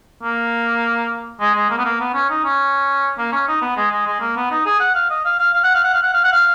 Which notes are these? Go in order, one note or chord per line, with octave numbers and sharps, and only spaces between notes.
A#3
G#3
G#3
A#3
B3
A#3
B3
C#4
D#4
C#4
A#3
C#4
D#4
B3
G#3
G#3
G#3
A#3
B3
D#4
G#4
F#5
F5
D#5
F5
F5
F5
F#5
F5
F#5
F5
F#5
F5
F#5
F5